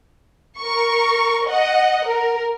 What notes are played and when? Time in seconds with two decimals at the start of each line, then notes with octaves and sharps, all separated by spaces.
0.60 A#4 C#6
1.49 D#5 F#5
2.07 A#4